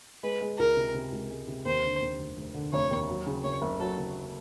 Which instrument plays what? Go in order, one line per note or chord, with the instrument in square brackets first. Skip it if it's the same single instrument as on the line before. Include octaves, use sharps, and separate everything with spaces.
[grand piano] G#3 [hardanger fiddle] B4
[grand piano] G#3
[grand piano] C#2 [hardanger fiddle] A#4
[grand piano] C3
C3
C#2
G#3
C3
[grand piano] D#2 [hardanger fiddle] C5
[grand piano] D3
D#2
F1
F1
D3
[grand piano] F1 [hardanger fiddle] C#5
[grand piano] D#2
F#3
C#3
[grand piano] F#1 [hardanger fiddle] C#5
[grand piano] F#1
[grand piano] F#3 [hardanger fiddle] A4
[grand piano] F#1